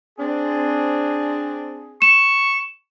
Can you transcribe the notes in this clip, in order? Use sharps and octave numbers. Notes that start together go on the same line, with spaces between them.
C4 D4 G#4
C#6 E7